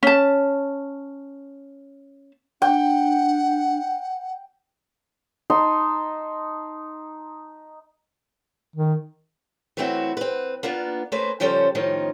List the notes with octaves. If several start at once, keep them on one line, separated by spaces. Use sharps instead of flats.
C#4 A5
D4 F#5 G5
D#4 A5 C6
D#3
E3 F#3 A3 C4 E4 F#4
C4 B4
A#3 B3 D4 F4
A3 A#3 C#4 B4 C5
C#3 F3 G3 C#4 A4 C5
A2 D#3 F3 C#4 D#4